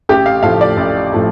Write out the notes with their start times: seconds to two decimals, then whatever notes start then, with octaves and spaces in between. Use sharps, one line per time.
0.09 A1 G4
0.26 F5
0.43 A2 F3 A3 F5
0.61 D5
0.77 A1
1.13 A2 F3 A3